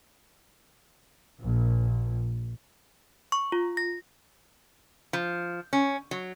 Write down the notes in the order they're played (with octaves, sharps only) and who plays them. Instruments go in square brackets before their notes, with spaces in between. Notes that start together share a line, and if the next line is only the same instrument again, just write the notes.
[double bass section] A#1
[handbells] C#6
F4
A#6
[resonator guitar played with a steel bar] F3
C#4
F#3